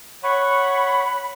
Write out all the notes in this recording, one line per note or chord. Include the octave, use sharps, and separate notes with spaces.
C#5 F#5 B5 C#6